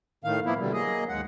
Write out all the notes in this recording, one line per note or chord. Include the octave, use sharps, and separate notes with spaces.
A2 D#3 F5
F3 A#3 B3 E4
B2 D3 G3
F#3 A#3 G#4 D#5
D#2 G#2 G#3 F#5